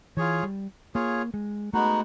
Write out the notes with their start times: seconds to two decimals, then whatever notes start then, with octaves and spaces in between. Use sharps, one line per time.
0.17 E3 F4 G#4 C#5
0.43 G3
0.95 A#3 F4 G#4 C#5
1.34 G#3
1.73 G#3 A3 B3 D#4 F#4